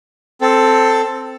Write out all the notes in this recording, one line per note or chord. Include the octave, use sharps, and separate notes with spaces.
C4 A4